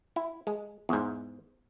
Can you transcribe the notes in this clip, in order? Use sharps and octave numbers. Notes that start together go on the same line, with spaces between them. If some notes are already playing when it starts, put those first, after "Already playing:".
E4
G#3
E2 G#2